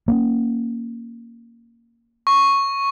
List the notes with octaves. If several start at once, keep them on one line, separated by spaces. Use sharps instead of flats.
A#3 B3 C#4
C#6